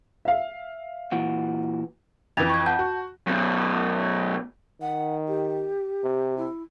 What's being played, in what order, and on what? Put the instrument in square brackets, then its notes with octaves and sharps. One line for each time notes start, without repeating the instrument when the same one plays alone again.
[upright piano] E5 F5
[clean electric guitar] A#2 E3 F#4
[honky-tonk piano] F2 E3 [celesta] G#6 A6 F7
[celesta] C#6 G#6
F#5 A5 G6
[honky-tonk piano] F#4
[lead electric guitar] F#2 B2
[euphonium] D#3 [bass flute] F#5
[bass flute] G4
[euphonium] C3
[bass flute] E4